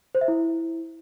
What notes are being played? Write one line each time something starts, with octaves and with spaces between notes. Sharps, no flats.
C5
E5
E4